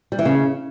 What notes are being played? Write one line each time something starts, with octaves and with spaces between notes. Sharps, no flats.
G3
E3
C#3